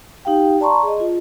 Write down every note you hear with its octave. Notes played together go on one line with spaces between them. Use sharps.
D#4 G4 F5 G5
D5 A5 A#5 C6 C#6
G#4 D#5
F4